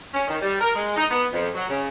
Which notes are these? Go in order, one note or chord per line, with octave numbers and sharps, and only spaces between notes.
C#4
D#3
G3
A#4
G#3
D#4
B3
F2
F#3
C#3